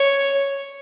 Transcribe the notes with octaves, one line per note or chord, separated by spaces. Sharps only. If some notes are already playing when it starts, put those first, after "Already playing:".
Already playing: C#5